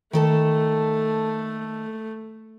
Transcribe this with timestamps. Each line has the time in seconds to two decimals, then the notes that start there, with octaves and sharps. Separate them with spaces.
0.13 D#3 A3 A4 A5